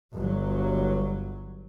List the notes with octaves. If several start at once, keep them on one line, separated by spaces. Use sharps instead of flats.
G1 F#3